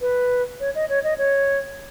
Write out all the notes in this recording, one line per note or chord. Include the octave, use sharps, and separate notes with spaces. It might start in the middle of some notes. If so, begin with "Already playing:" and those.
B4
C#5
D#5
C#5
D#5
C#5